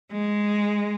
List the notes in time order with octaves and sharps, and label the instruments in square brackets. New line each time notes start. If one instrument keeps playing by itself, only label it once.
[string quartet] G#3